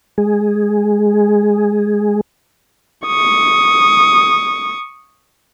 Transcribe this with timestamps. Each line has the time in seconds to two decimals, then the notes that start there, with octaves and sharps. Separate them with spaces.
0.18 G#3 G#4
3.07 C#6 D#6